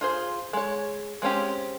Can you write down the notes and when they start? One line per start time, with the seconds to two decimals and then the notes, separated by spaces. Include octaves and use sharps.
0.01 F4 G#4 C5
0.53 G#3 C#5
1.22 G#3 C4 C#4 G4